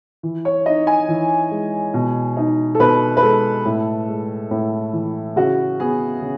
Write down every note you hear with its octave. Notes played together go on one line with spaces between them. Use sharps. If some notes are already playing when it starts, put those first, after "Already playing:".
E3
C#5
D#4 D#5
G#5
E3
G#3
B2
D#4
A4
B2 B4
B4
G#3 A4
A2
G#3
A2
E3
C#3 F#4
B3 G#4
C#3